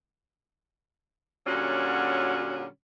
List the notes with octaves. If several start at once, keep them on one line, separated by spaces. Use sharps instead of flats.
A#2 D3 F#3 G3 C#4 F#4